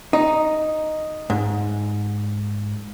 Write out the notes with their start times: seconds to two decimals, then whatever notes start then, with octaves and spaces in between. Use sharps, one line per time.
0.13 D#4
1.30 G#2